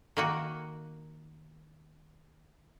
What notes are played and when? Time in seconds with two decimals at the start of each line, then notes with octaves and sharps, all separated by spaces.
0.17 D#3 A#3 F#4